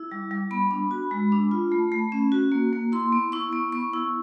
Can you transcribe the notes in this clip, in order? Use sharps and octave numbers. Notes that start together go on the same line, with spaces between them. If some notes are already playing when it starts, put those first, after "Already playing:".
Already playing: E4
G3
G3
B3 B5
D4
F#4
G#3
D4
F4
A3
A3
C#4
F#4
A#3
A#3
E4 C6
B3
E4 C#6
B3
B3 C#6
E4